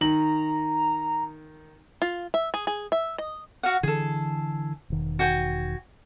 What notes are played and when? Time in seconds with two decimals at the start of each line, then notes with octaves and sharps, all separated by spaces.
0.01 D#3 A#5 F#7
2.02 F4
2.34 E5
2.54 G#4
2.67 G#4
2.92 E5
3.18 D#5
3.63 F#4 F5 F#5
3.83 D3 E3 G#4 A4
4.90 E1 D#3
5.19 F#4 G5 G#5